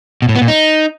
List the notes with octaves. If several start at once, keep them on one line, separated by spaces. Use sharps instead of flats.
B2
A2
B3
A#2
D#4